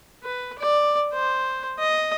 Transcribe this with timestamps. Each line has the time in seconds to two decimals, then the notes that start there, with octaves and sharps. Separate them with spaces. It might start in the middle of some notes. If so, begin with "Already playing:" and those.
0.24 B4
0.59 D5
1.14 C5
1.79 D#5